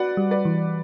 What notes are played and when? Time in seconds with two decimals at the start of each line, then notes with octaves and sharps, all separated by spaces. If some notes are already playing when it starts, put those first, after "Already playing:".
Already playing: F#4 B4 D5 F#5
0.17 G3
0.31 B4 D5
0.45 E3